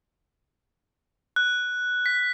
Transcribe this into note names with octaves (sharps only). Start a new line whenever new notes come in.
F#6
B6